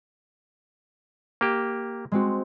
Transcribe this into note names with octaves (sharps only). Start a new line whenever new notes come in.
A#3 G4
G#3 C4 F#4